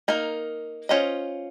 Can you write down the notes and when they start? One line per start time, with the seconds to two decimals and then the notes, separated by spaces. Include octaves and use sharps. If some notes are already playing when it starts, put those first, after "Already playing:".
0.08 A#3 D#4 A#4
0.89 C#4 F4 C5 D#5